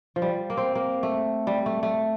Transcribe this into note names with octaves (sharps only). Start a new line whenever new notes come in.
F3
G3
A#3
C4
A#3
A3
G3
A3
A3